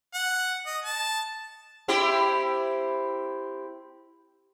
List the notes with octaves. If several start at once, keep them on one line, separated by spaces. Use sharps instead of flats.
F#5
D#5
A5
C4 E4 G4